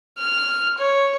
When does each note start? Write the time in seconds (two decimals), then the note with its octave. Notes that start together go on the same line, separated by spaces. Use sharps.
0.18 F6
0.78 C#5